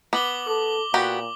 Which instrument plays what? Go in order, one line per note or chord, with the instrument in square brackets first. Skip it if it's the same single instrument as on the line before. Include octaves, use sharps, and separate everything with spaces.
[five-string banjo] B3 [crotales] D6 F#7 G7
[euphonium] A4 [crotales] D6
[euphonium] A#2 [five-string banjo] B3 F#4 G4